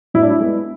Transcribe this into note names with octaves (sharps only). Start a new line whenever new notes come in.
A2 E4
D4
E4
G#3 B3